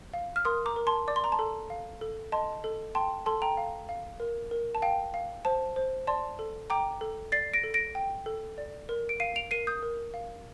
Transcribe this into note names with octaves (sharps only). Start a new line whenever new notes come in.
F5
F6
A#4 C6 D#6
A#5 D6
A#4
A5 C6
D5 D6
C6
A#5
A5 C6
A4
F5
A4
D#5 A5 C6
A4
G5 A5 C6
A4 A5 C6
G5 A#5
F5
F5
A#4
A#4
A5
F5 G5
F5
C5 A5
C5
D5 A5 C6
A4
G5 A#5 D6
A4
D5 A6 C7
A#6 D7
A4
A#6 D7
G5
A4
D5
A#4
D7
F5 C7 D#7
D7 F7
A#4 C7 D#7
D#6 G6
A#4
F5